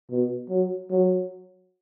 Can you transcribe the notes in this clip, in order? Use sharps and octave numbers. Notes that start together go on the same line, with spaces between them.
B2
F#3
F#3